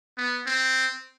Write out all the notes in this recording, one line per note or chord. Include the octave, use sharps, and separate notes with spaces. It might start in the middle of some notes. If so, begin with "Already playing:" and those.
B3
C4